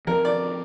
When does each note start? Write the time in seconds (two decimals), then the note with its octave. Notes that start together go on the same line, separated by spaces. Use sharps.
0.07 F3 C4 A#4
0.25 D5